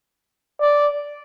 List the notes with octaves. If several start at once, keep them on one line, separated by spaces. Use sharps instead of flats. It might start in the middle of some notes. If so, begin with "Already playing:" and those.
D5